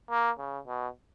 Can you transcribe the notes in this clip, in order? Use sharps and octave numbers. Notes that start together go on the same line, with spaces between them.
A#3
C#3
B2